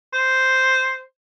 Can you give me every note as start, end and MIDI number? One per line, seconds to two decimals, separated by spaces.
0.13 1.00 72